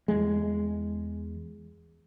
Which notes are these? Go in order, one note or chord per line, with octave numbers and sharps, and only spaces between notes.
E2 G#3